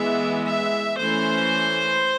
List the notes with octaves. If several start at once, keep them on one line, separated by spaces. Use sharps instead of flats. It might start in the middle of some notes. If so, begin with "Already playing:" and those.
Already playing: E3 G#3 B3 E5
E5
E3 A3 C#4 C5